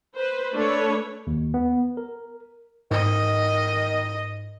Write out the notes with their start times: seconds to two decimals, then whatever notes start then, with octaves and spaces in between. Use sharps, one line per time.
0.15 B4 C5
0.54 A3 D4 A4 B4 C#5
1.27 D#2
1.54 B3
1.97 A#4
2.91 G#2 D#3 D#5